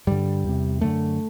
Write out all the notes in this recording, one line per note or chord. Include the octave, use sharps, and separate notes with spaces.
G2 D3 G3
E2 C3
F#2 D3 A3